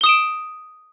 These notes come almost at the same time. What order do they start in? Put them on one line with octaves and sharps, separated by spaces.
G7 D#6 E7 D7